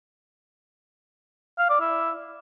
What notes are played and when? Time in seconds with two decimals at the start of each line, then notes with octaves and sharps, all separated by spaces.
1.59 F5
1.70 D5
1.80 E4